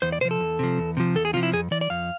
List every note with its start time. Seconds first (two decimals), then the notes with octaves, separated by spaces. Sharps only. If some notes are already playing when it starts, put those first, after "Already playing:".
0.02 E2 C5
0.12 D5
0.21 C3 F3 C5
0.31 A4
0.40 E2
0.59 C3 F3
0.78 E2
0.97 C3 F3
1.15 E2 A4
1.25 G#4
1.33 C3 F4
1.37 F3
1.43 E4
1.53 F2 G#4
1.71 E3 D5
1.81 D5
1.90 F2 F5